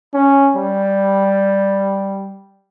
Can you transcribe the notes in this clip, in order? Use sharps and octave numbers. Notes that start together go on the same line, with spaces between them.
C#4
G3